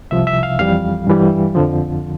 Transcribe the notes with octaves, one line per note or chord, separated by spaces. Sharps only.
C2 C3 F3 E5
E5
F5
F2 E3 G3 F5
G2 E3 G3
F2 D3 F3